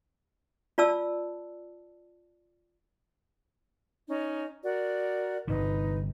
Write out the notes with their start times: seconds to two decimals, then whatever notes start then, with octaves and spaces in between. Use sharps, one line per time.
0.78 F4 D5 A5 E6
4.09 C#4 D#4
4.64 F#4 A#4 D5
5.48 G1 G2 C3 D#4 B4